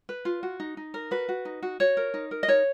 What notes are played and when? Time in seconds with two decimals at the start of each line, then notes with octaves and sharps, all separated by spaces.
0.09 B4
0.25 F4
0.43 F#4
0.60 D#4
0.77 D#4
0.94 A#4
1.11 F#4 B4
1.29 F#4
1.45 D#4
1.63 F#4
1.80 F#4 C#5
1.97 A#4
2.14 D#4
2.31 A#4
2.43 D#5
2.48 D#4 C#5